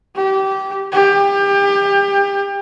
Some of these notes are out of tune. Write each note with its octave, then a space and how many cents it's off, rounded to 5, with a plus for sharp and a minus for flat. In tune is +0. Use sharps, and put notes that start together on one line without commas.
G4 -20
G4 +30